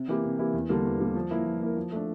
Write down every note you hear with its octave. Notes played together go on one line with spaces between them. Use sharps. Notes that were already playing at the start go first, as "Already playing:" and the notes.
Already playing: C3
E3 A#3 E4 G4
C3
E3 A#3 E4 G4
E2
D3 G3 A#3
E2
D3 G3 A#3
F3
A#3 E4 A#4
F3
A#3 E4 A#4
F3
A3 D4